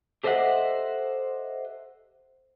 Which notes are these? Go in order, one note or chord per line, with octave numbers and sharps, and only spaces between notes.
G4 A4 C5 D#5 E5 F#5